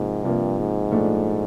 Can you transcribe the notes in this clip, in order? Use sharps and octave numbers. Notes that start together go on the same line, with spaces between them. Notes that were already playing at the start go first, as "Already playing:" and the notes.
Already playing: G#2 C3 F3 A#3
G2 C3 F3 A#3
G#2
A#2 F3 A3 D4